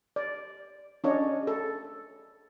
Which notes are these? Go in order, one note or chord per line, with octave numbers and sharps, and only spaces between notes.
D5
C#4 D4 C#5 D#5
G#4 A4